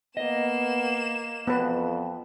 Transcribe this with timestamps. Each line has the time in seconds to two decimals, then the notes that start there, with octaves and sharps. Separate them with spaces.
0.17 A#3 B3 D#5 E7
1.47 F2 B3 B4